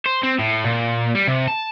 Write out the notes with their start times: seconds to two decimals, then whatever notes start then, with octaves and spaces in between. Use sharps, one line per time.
0.06 C5
0.23 C4
0.39 A2
0.64 A#2
1.15 G3
1.28 C3
1.48 A5